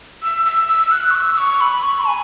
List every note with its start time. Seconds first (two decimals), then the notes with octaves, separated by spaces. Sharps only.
0.23 E6
0.46 E6
0.68 E6
0.91 F#6
1.10 C#6
1.15 E6
1.38 C#6
1.61 B5
1.83 C#6
2.07 G#5